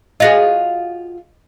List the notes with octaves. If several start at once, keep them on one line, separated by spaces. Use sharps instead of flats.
F4 F#4 G#4 D#5 A#6